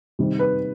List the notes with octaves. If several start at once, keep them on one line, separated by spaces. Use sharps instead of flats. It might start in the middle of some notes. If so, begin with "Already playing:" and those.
C3 D#3 G3
B4